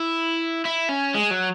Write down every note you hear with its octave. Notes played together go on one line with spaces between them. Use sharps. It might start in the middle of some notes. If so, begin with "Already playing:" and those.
Already playing: E4
E4
C#4
G#3
F#3